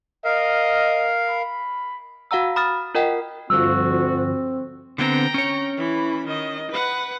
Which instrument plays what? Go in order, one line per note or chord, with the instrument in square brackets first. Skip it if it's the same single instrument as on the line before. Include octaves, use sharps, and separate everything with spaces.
[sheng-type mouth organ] A#4 F5 [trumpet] D#5
[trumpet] B5
[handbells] F#4 F5 F#5 A#5 E6
B5 D#6 F6 A6
F4 A#4 D#5 F#5 G5
[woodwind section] D2 F4 F#4 [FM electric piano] G2 D3 F3 [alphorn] C4 [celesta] E6
[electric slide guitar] D3 B3 C4 [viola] G5 A#5
[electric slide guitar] C#4 C#5
[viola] E3 B5
D#3 D#5
B4 F#5